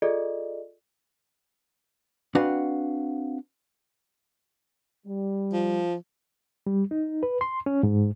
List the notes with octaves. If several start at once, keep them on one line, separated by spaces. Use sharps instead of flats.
F4 G#4 A4 D5 D#5
C4 D4 F#4 B4 F5 F#5
G3
F3
G3
D#4
B4
C6
C#4
G#2